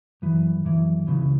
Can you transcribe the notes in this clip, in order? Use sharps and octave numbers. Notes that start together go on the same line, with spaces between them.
F#2 E3
F#2 E3
C#2 C#3 E3